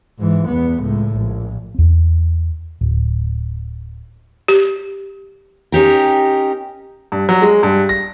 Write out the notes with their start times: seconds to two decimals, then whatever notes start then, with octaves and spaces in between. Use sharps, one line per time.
0.18 G#2 E3
0.47 E2 B3
0.82 C#2 A2
1.18 A#1
1.75 E2 C4
2.81 D1
4.48 G4
5.72 C#4 D#4 G4 A#4
7.12 G2
7.29 F#3
7.42 G#3
7.63 G2
7.89 A#6